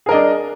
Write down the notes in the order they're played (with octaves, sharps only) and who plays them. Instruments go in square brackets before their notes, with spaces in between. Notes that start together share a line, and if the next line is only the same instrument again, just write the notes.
[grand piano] G#4
A#4
D#5
D4